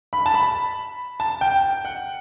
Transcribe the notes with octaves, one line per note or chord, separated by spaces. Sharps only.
B5
A5
B5
A5
G5
G5
F#5